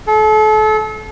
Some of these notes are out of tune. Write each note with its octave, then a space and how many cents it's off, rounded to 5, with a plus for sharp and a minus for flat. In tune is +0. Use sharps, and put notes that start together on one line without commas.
A4 -35